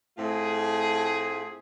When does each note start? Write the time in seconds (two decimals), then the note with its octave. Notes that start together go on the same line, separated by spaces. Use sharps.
0.18 A2 A3 C4 F4 G#4